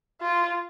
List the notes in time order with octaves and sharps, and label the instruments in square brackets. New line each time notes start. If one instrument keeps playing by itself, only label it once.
[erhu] F4